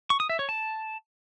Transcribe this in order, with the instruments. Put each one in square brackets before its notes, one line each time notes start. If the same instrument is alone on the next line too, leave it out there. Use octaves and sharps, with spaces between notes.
[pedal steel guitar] C#6
D#6
E5
C#5
A5